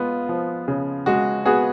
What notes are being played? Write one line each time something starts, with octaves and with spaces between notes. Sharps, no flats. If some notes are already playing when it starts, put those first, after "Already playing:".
Already playing: G#3 B3 F4
F3
C#3
G#3 F#4
B3 F#4 G#4